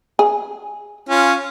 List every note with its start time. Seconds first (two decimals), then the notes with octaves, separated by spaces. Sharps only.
0.19 G#4
1.09 C#4 F4